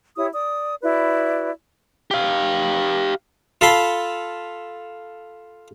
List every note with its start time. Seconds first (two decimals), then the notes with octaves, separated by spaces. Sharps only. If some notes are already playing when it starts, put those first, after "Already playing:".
0.17 E4 G4 C#5 D#6
0.34 D5 D#6
0.82 E4 F#4 B4 D5
2.11 G4 F5
3.61 F4 A4 B5 C6